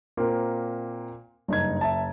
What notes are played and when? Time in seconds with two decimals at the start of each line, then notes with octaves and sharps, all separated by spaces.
0.17 A#2 A#3 C4
1.48 F#1 G2 D#4 G#6
1.81 E5 A5